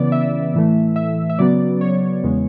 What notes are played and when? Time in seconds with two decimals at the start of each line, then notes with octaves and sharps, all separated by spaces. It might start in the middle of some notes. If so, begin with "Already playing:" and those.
Already playing: C#3 E3 B3 D5
0.12 E5
0.54 A2 E3 A3
0.96 E5
1.30 E5
1.39 C#3 F#3 B3 D5
1.81 C#5
2.23 E2 C#3 G#3 B3